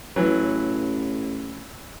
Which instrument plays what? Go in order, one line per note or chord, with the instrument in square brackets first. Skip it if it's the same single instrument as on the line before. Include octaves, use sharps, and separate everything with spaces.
[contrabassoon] A1 [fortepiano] E3 F#3